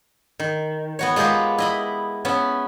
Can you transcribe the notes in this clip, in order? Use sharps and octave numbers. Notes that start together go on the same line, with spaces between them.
D#3
B3 F#4 C#5
G#3 B3 F4 G4 G#4 A#4
E4 D#5 B5
B3 C#4 E5